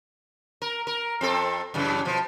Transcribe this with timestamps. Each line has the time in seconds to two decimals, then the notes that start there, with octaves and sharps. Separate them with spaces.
0.62 A#4
0.87 A#4
1.21 F2 C4 A4
1.74 F#2 C#3 E3
2.05 B2 F3